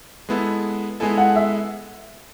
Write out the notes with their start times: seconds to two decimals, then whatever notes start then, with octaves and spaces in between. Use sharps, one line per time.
0.29 G#3 B3 E4 A4
1.00 G#3 B3 E4 A4 G#5
1.18 F#5
1.36 E5